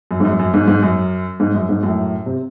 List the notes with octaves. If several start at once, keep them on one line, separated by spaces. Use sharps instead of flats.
F#2
G#2
F#2
F#2
G#2
G#2
F#2
G#2
F#2
G#2
F#2 A2
C3